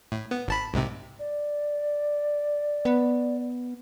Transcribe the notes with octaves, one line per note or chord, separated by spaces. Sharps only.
A2
B3
G#1 A5 B5
C2 G#2 C3
D5
B3